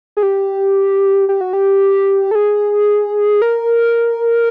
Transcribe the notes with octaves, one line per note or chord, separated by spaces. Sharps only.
G#4
G4
G4
F#4
G4
A4
G#4
A#4